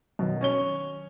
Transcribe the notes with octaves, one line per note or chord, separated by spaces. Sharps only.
B2 D#3 F#3
C#4 C#5 G7